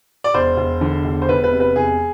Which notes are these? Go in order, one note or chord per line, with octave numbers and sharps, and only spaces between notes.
D5
E1 C5
E1
D3
E1
C5
E1 B4
B4
C3
B4
E1 G#4